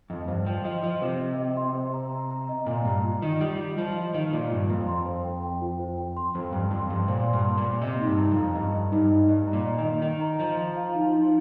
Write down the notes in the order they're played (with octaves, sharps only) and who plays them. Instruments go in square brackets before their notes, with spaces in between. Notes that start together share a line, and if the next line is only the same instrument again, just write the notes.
[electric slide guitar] F2 [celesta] D#5
[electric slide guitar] G2 [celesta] C5
[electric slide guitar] F3 [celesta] G5
[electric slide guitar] F3 [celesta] D#5
[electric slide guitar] F3 [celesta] D#5
[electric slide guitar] C3 [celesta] C5
[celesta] D#5
D#5
C6
C5
A#5
A#5
A#5
D#5
[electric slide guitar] A#2 [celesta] A#5
[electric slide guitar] G2 [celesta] A#5
[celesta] F4
[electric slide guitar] D#3 [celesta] D#5
[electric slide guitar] G3 [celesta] F4
[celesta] D#5
[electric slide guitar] F3 [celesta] F4
[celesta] D#5
[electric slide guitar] D#3 [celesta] D#5
[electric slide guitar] A#2 [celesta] F4
[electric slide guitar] G2 [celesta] F4
[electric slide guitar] F2 [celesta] A#5
[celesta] C6
C5
G5
G5
F4
C5
G5
C6
[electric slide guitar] F2 [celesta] C5
[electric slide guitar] G2 [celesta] G5
[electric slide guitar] F2 [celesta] C6
[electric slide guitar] G2 [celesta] C6
[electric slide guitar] A#2 [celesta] C5
[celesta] C6
[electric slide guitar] G2
[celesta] C6
[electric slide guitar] A#2
[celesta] C6
[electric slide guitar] C3 [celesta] D#5
[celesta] D#4
[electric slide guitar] G2
[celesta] A#5
[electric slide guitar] F2
[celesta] A#5
[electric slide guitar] G2 [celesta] D#5
[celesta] D#5
[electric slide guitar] G2 [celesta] D#4
[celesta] D#5
[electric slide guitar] G2 [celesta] D#5
[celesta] A#5
[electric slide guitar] A#2
[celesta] D#5
[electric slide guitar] D#3
[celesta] D#5
[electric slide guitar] D#3 [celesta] D#5
[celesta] A#5
[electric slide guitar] F3 [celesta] D#5
[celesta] A#5
F5
D#4
D#4